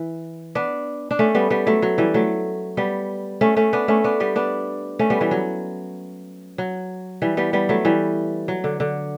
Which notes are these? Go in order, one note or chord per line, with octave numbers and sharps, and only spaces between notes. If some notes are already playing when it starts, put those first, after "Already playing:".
Already playing: E3
B3 D4
D4
A3 C#4
G3 B3
G3 B3
F#3 A3
F#3
E3 G3
F#3 A3
G3 B3
A3 C#4
A3 C#4
B3 D4
A3 C#4
B3 D4
G3 B3
B3 D4
A3 C#4
G3 B3
E3 G3
F#3
F#3
E3 G3
G3 B3
G3 B3
F#3 A3
E3 G3
F#3
D3
D3